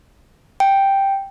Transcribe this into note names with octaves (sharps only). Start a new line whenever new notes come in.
G5